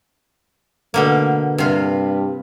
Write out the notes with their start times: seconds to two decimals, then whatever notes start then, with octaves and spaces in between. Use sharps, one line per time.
0.94 B2 D3 A3 A#3
1.58 G2 C3 F4